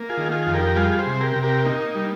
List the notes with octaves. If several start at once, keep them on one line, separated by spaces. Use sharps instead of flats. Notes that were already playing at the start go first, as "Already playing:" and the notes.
Already playing: A#3
F4 G#4
D#3
F4 G#4
F2
G4 A#4
G3 F4 G#4
G#4 C5
C3
G4 A#4
C3
G4 A#4
A#3 D#4
G3